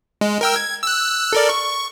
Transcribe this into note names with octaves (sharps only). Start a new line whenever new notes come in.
G#3
A#4 G5 E6
G#6
E6 F#6
A4 A#4 D5
C#6